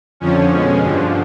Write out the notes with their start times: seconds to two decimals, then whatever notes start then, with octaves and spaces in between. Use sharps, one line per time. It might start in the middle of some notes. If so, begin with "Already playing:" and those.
0.20 F2 D3 F3 C#4
0.51 B2 G#3
0.81 G2 D3 F3